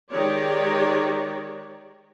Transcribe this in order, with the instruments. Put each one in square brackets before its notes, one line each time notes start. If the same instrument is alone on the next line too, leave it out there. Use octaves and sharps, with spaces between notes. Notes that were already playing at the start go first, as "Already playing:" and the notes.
[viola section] D#3 G#3 G4 C#5 D5